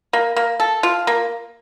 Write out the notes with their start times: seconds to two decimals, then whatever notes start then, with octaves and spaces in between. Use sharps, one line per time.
0.13 A#3
0.36 A#3
0.60 A4
0.83 F4
1.07 A#3